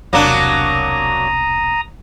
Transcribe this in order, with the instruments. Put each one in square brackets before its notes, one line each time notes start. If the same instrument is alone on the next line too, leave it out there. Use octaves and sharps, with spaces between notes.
[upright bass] E1 C2 [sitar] F#3 A#3 D4 [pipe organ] A#5 D#6